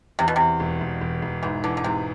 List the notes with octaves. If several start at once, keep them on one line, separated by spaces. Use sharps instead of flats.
E2 C3
B2
E2 C3
E1
E1
E1
E1
G#2 E3
D3 E3
D3
G#2 C3